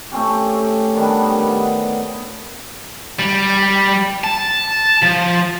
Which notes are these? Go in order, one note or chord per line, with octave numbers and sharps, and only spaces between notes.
A3 C4 C#4 G4
D#3 G3 B3 D4
D#4 F#5
G3
A5
F3